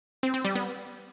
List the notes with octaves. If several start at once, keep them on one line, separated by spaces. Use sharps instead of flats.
C4
C4
G3
B3